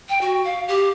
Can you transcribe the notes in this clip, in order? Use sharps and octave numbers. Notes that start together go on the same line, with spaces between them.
G5
F#4
F5
G4